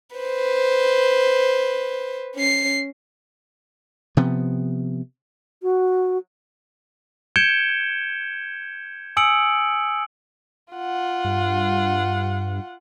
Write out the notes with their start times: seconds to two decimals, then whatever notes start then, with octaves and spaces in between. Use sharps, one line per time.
0.16 B4 C5
2.35 C#4 C7
4.17 C3 F3 B3
5.63 F#4
7.36 G6 G#6 C#7 D7 E7 G7
9.17 G#5 D#6 E6 C#7 D7 F#7
10.74 F4 F#5
11.25 G2